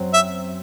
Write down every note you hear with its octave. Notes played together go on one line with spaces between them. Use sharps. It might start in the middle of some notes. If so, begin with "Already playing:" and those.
Already playing: F#2 F#3 C4
E5